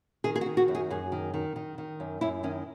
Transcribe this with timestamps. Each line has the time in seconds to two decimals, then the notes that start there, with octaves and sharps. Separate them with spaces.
0.24 D#3 G#4
0.36 G#4
0.41 F#4
0.46 D#3
0.57 F#4
0.68 F#2
0.75 G#4
0.90 F#2 G#4
1.12 D#3
1.34 D#3
1.56 D#3
1.78 D#3
2.00 F#2
2.21 F#2 E4
2.43 D#3 C#4